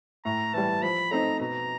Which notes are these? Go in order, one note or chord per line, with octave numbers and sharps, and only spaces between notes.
A2 A#5
E3 G3 A5
F3 B5
A3 C4 D#4 A#5
B2 A#5